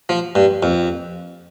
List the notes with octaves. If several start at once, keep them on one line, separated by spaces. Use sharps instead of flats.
F3
G2
F2